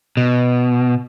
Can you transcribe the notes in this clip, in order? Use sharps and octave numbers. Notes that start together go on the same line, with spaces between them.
B2